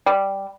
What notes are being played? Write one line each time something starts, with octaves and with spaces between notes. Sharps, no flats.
G3